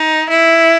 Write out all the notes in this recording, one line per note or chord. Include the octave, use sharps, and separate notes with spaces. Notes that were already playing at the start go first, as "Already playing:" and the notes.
Already playing: D#4
E4